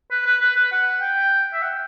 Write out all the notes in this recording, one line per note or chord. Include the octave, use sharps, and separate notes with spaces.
B4
B4
B4
B4
F#5
G5
E5
F#5